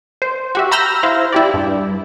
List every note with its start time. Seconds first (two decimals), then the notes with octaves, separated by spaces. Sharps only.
0.22 C5
0.55 F#4 G4 E5
0.71 A#5 B5 E6 F6 G6 A#6
1.03 E4 C5 F5
1.33 E4 G4 D5
1.54 G2